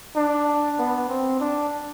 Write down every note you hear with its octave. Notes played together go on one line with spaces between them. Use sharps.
D4
B3
C4
D4